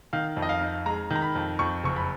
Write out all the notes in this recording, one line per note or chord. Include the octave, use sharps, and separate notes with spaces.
D#3 F5
F2
D#5
F5
D#4
G#3 A#5
D#3
A#5
B5
F2
F2 C#6
F#1 C#6
B5